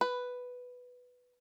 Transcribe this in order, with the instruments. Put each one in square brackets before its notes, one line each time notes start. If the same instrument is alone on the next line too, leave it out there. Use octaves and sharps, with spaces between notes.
[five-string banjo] B4